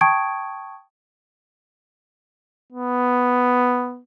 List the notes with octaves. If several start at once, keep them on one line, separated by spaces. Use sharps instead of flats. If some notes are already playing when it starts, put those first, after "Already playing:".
G5 A5 C#6 D#6 G#6 D7
B3